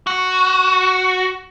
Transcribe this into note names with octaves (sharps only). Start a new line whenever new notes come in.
F#4